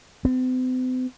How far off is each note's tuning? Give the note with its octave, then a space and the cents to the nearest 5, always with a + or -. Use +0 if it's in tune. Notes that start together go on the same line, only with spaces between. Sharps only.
C4 -45